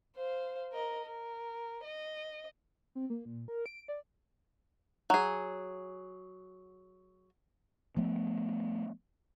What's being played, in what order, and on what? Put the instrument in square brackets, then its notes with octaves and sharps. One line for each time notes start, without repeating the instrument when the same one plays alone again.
[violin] C5 F5
A#4 D#5
A#4
D#5
[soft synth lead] C4
A#3
A#2
A#4
D7
D5
[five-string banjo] F#3 G#4
[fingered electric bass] F3 A3 B3